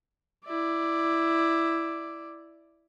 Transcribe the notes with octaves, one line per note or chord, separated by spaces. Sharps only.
E4 D5